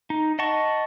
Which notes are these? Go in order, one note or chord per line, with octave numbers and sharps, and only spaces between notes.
D#4
D#5 F#5 A5 C#6